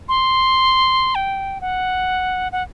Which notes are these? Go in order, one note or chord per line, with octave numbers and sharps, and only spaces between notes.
C6
G5
F#5
F#5